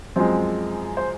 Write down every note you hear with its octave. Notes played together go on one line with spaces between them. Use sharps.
F#2 F3 G#3 C4 C5
C5